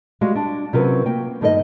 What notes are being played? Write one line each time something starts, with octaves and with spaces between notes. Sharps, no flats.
G3 G#3 F#4 F5
D4
C3 F#3 C#4 F4 A#4 B4
A#3 G5
G2 D#3 D#4 A#4 D#5